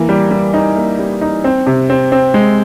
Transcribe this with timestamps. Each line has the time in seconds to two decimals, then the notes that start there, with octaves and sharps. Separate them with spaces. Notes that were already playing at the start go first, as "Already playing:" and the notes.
Already playing: E3 A#3
0.09 G3
0.31 G3
0.54 D#4
0.76 A#3
0.99 G3
1.21 D#4
1.44 C4
1.67 C3
1.90 C4
2.12 C4
2.34 G#3